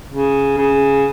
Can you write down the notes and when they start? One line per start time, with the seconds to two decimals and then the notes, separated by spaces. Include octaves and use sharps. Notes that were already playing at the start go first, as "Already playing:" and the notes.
0.10 C#3
0.57 C#3